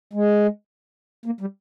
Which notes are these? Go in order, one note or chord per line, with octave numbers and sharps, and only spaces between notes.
G#3
A#3
G3